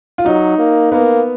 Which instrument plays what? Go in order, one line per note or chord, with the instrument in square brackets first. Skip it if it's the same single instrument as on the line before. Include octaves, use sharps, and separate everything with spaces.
[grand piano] F4
[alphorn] F#3 [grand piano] D#4
[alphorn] A#3
[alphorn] A#3 [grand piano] B3